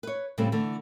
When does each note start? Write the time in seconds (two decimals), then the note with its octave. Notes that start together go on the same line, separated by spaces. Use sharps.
0.03 B4 C#5
0.38 A2 C#3 G3 A3 C4
0.52 D3 E3 A3